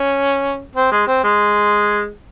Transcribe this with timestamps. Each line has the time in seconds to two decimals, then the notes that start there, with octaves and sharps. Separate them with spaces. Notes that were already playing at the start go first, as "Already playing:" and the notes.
Already playing: C#4
0.76 C4
0.91 G#3
1.07 C4
1.24 G#3